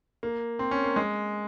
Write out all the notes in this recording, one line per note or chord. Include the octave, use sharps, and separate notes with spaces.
A#3
C4
C#4
A#3
G#3